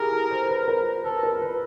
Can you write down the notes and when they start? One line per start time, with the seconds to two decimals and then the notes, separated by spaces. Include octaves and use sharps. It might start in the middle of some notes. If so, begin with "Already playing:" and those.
Already playing: E4 G4 G#4 A#4
0.12 A4
0.31 C5
0.49 B4
0.68 A#4
1.04 A4 B4
1.23 A#4
1.42 B4